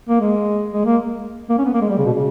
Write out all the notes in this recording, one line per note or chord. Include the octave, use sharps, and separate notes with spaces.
A#3
G#3
G#3
A#3
A#3
C#4
B3
A#3
G#3
G3
C#3
B2
C#3